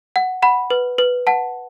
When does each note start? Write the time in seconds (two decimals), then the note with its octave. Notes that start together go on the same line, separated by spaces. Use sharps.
0.16 F#5
0.42 F#5 B5
0.70 B4
0.98 B4
1.27 F#5 A5